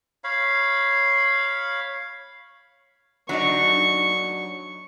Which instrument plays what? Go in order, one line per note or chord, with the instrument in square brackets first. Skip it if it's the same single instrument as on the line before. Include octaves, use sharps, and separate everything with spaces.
[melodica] C#5 F5 B5
[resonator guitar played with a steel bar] F#3 D4 D#4 [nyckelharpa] C#6